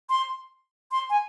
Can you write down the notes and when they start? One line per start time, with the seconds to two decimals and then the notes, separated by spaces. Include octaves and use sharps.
0.10 C6
0.92 C6
1.10 G#5